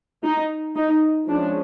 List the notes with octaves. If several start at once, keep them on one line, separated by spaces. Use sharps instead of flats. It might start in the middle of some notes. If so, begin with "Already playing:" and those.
D#4
D#4
F3 G#3 C#4 D4